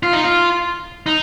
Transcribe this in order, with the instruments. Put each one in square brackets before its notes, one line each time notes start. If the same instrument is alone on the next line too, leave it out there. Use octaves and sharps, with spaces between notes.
[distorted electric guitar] F4
D#4
F4
D#4